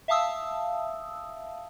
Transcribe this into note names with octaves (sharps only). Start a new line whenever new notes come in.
E5 F5 A5 D#6 E6